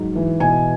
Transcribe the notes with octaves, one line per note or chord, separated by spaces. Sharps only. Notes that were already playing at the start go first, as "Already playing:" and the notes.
Already playing: G#2 F#3
E3
B2 G#5